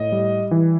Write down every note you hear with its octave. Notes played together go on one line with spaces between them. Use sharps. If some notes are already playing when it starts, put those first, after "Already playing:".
Already playing: A2 D#5
G3
E3